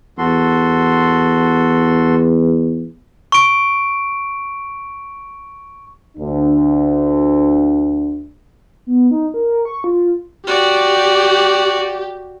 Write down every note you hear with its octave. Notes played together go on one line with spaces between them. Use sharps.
E2 F#4 A4 C6
C#6 D7
D2 D4
B3
D#4
A#4
C#6
F4
F#4 G4 D5